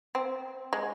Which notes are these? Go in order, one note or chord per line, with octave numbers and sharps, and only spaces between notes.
C4
G#3